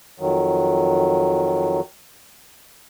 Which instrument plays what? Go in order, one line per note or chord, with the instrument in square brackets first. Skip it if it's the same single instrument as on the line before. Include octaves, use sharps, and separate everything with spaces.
[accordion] F2 D#3 F#3